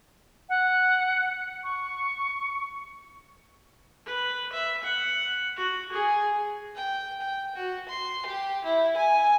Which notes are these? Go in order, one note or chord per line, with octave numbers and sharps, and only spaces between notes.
F#5
C#6
B4
E5
F#5
F#4
G#4
G5
G5
F#4
C6
G4
E4
G#5